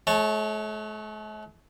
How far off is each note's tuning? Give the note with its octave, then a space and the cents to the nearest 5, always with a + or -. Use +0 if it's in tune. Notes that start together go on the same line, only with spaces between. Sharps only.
A3 -45 C#5 -15 A5 +0